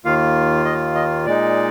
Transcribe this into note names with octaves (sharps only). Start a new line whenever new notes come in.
D#2 D#3 A#3 F4 F5
D#5
D#5
A#2 G#3 D#4 D5